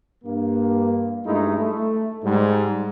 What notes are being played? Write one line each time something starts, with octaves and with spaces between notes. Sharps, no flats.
G2 A#3
G2 G#3 A3 D#4 E4
A3
G#2 G3